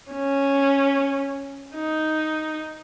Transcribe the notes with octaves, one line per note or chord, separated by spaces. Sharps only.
C#4
D#4